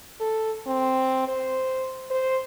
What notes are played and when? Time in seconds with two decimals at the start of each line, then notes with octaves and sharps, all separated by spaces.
0.21 A4
0.67 C4
1.28 C5
2.10 C5